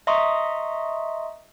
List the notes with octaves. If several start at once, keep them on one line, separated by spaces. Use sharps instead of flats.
D#5 E5 A#5 C6 C#6 D#6